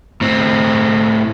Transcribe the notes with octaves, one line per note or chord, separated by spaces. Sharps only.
A2 C4